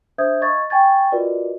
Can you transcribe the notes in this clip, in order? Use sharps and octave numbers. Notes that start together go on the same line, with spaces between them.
D4 C5 E5 D#6 G6 G#6
D#5 F5 C#6 G#6 A6
G5 G#5 C#6 G#6 A6
F4 F#4 A#4 B4 D5 D#5